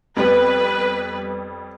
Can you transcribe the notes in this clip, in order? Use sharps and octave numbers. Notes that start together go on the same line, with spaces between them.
F2 G3 B3 B4